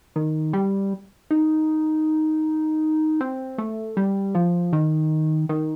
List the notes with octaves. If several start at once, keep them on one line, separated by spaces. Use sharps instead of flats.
D#3
G3
D#4
C4
A3
G3
F3
D#3
D#3